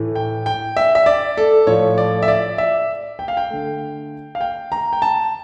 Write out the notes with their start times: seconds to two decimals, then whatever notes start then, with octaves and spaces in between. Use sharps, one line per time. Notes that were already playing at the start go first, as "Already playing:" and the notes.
Already playing: A2 E3 A3
0.16 G5
0.46 G5
0.77 E5
0.95 E5
1.06 D5
1.37 A4
1.67 A2 F3 A3 C#5
1.98 D5
2.22 E5
2.28 D5
2.58 E5
3.19 G5
3.28 F5
3.37 G5
3.50 D3 A3
4.35 F5
4.41 G5
4.72 A#5
4.93 G5
5.02 A5